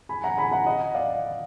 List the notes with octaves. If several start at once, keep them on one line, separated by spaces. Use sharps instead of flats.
G#5 B5
F#5 A#5
G#5 B5
F#5 A#5
D#5 F#5
D5 F5